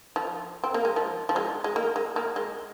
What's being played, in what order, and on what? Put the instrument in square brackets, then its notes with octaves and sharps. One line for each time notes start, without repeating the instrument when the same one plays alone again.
[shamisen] F3
C4
A#3
G#3
F3
F3
G#3
G#3
A#3
G#3
A#3
G#3